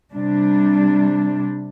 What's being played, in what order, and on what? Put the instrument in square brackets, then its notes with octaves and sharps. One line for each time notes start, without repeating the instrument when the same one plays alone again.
[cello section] C3 G3 D4